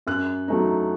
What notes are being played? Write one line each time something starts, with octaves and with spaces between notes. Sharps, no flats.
F#2 F#6
F#3 A3 D#4